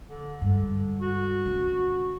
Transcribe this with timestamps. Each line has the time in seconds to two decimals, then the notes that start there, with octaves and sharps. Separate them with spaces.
0.09 D3
0.41 G2 D3 G#3
1.00 F#4
1.45 D3 C#4